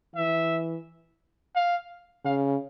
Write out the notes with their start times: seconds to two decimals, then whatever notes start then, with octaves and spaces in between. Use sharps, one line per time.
0.16 E3 E5
1.55 F5
2.25 C#3 F5